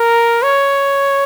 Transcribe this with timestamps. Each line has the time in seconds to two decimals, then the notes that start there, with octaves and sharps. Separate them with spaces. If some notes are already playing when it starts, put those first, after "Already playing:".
Already playing: A#4
0.43 C#5